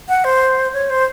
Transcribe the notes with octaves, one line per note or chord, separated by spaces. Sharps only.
F#5
C5
C#5
C5